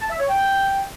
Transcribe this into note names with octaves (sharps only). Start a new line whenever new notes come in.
A5
E5
C#5
G5